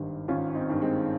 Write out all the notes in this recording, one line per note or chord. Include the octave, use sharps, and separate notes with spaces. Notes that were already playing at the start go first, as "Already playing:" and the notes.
Already playing: G#1 G2 D#3
G#1 C#4 F4
C4 D#4
G2 D#3
G#3 C4